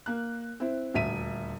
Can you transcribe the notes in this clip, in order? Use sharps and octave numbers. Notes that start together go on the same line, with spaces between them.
A#3 F#6
C4 E4
D#1 D2 E5 B6 D#7